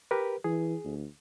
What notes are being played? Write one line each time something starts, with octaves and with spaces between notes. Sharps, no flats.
G4 A#4 B4
E3 G#4
D2